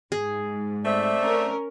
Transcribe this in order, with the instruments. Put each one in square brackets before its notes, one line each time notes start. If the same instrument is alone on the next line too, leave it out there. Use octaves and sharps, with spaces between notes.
[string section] G#2 [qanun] G#4
[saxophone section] A3 C4 E5 [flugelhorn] D5
[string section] C#4 A#4